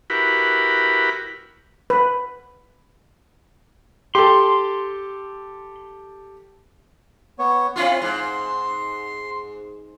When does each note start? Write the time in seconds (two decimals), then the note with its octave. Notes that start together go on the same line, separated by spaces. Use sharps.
0.10 E4 F#4 G4 A#4 B4 B5
1.90 B4
4.15 G4 A4 C6
7.39 B3 C#5
7.76 C4 E4 F4 C6
8.02 G#2